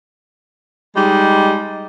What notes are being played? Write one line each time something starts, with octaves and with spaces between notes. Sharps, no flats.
G3 G#3 D#4